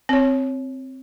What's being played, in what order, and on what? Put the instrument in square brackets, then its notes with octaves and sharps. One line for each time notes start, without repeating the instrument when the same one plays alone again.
[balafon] C4 C#5